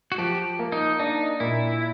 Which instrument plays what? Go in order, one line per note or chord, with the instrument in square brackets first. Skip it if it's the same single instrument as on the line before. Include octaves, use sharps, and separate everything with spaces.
[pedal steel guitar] F#4
[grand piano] F3 [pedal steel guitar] G4
[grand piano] A#3
[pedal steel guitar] D#4
[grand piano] D4 [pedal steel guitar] D#4
[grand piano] A#2 [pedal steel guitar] E4